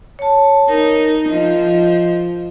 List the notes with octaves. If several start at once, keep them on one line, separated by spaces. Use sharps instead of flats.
C#5 A5
D#4 A#4
F3 D#5